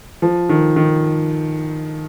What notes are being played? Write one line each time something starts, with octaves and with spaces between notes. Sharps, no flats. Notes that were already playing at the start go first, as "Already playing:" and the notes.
F3
D#3
D#3